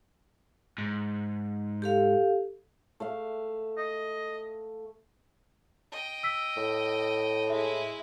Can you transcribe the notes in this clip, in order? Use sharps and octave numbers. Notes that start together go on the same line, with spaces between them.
G#2
G4 A4 F5
A3 E5 F5
D#5
D#5 G5
E6 B6
A2
G#3 E4 E5